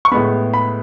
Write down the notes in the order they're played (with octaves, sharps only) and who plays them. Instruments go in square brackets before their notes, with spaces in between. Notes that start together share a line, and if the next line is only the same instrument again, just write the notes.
[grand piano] C#6
A2 G#3 B3 B5
B5